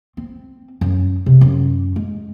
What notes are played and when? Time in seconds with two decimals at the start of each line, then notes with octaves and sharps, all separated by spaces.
0.17 C4
0.81 F#2
1.26 C3
1.41 F#2
1.96 G#3